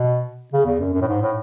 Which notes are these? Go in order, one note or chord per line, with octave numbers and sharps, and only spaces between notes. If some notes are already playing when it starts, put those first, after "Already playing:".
Already playing: B2
C#3
E2
F#2
F#2
A2
G#2
A2